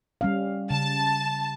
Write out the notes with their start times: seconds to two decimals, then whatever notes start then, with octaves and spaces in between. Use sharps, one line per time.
0.21 G3 C#4 F5
0.70 C#3 A5